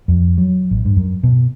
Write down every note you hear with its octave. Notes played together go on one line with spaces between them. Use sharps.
F2
F#3
A1
G2
F#2
B2